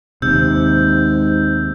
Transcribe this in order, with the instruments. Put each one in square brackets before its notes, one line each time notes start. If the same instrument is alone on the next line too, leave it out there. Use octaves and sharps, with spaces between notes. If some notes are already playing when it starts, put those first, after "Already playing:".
[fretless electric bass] D#2 C3 [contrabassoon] G#2 [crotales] E6 G6